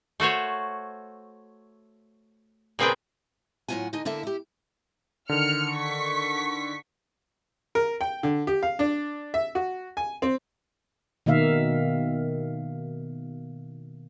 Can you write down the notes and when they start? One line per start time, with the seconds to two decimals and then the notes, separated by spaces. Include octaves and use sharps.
0.20 A3 F#4 C5 C#5
2.79 A#2 C#3 C4 G#4 B4 G5
3.68 A2 F#3 E4 F4 F#5 G#5
3.93 D3 D#4 D#5 G#5
4.05 D3 A#3 E4 A4 E5
4.23 E4 G4
5.29 D3 D#3 F6 C#7
5.73 C#6 B6
7.75 A#4
8.01 G5
8.23 D3
8.47 G4
8.63 F5
8.79 D4
9.34 E5
9.55 F#4
9.97 G#5
10.22 C4
11.26 B2 D#3 A#3 E5 F5